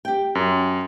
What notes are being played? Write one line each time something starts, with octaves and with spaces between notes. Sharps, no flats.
G4 G5
F#2